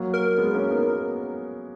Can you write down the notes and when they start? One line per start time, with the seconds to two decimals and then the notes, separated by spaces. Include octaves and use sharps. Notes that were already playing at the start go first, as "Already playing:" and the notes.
Already playing: F#3 A#3
0.14 A#4
0.38 G#3 B3
0.55 A#3 C#4
0.71 B3 D#4